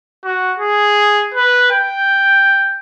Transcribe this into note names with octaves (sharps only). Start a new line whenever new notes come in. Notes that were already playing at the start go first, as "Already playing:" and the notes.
F#4
G#4
B4
G5